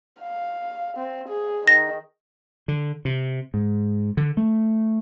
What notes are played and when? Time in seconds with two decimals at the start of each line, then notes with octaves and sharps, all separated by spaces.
0.21 F5
0.97 C4
1.28 G#4
1.68 D#3 A#6
2.68 D3
3.05 C3
3.54 G#2
4.17 D3
4.37 A3